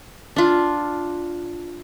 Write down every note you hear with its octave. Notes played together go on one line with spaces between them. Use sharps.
D4 F4